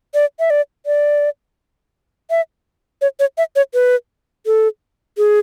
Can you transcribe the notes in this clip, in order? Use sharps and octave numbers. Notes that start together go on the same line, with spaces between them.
D5
E5
D5
D5
E5
C#5
C#5
E5
C#5
B4
A4
G#4